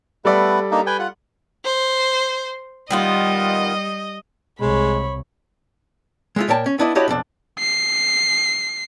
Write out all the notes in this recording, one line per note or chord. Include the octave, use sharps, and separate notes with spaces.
G3 A3 B3 A4 B4 D5
A#3 D4 D#4
B4 G5 G#5
F4 F#5
C5
D#3 G3 B3 F4 D#5
C2 G#3 C#5 B5
G#3 A3 F4
A#2 A#4 C#5 G5 A5
C#4
B3 D4 E4 D#5
D4 E4 F#4 G4 C#5 D#5
B1 F2 D4
C7